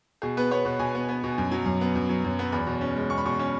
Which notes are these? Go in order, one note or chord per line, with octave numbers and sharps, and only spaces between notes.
B2 G#4
B3 B4
B3 C#5
B2 B4
B2 G#5
B3
B3
B2
F#2
F#3
F#2
B3
F#2
F#3
F#2
B3
E2 B5
B2
C#4
G#3
E2 C#6
B5
B2 C#6
C#4